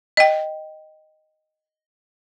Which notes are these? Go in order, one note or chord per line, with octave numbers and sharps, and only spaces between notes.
D#5 G5